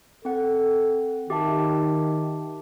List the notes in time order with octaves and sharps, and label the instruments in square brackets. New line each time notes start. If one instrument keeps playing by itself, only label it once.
[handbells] C4 F#5 [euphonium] A4
[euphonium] D#3 [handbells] G4 E5 A5